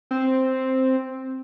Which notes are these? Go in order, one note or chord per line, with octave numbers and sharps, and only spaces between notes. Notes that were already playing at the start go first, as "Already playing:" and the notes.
C4